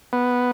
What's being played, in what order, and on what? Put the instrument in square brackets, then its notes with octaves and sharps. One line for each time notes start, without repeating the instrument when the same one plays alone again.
[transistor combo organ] B3